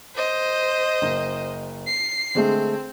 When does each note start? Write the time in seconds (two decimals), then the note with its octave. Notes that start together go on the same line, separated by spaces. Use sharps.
0.15 C5 D#5
1.02 F#1
1.87 C7
2.35 D3 G#3 A3 C4